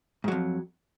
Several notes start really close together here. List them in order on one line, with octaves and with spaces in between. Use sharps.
G#2 F#3 F2